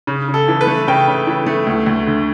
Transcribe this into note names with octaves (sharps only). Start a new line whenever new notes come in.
C#3
C#3
A4
E3
B4
A3
C#3 G5
C#3
E3
A3
D2
D2
D3